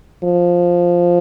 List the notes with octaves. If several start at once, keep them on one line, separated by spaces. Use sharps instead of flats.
F3